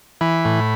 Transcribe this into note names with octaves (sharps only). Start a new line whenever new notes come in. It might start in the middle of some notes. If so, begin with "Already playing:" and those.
E3 B5
A2